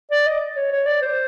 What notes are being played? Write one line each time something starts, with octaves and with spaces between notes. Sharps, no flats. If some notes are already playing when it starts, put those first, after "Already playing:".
D5
D#5
C#5
C#5
D5
C5